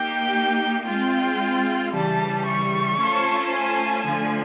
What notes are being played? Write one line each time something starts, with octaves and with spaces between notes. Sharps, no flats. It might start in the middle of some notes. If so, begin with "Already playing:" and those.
Already playing: A#3 D#4 G4 G5
G#3 C4 F4 G5
C#3 E3 G3 A5
C#6
A3 C#4 F4 A4 C5
G#5
D3 F3 A3